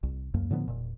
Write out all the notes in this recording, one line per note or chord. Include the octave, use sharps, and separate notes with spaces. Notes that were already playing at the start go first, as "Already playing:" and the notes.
C2
C#2 F#2 A#3
A2 D3 F3 B3
E1 A#2